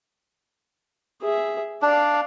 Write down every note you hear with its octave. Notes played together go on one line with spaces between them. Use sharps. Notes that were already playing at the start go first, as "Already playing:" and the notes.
G#4 E5
D4 D5 F5